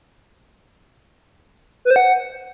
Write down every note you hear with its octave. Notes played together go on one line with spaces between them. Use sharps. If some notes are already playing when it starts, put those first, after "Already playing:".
B4
C5
F#5